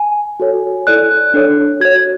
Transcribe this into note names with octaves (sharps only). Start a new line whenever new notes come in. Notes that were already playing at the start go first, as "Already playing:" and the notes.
Already playing: G#5
F#4 A4 C#5
E4 A4 D5 F#6
D4 A4 C#5
F#4 C#5 G#6